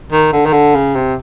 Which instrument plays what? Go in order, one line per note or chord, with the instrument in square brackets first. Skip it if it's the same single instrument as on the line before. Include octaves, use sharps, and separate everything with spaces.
[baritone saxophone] D#3
D3
D#3
D3
C#3
C3